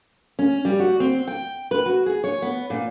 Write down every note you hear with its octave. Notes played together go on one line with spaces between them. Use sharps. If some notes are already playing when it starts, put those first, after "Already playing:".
C#4
G3
F#4
C4
G5
B4
F#4
G#4
C#5
B3
A#2